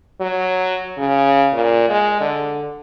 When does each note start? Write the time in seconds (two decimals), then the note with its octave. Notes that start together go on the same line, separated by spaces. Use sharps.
0.21 F#3
0.98 C#3
1.53 A#2
1.89 G#3
2.21 D3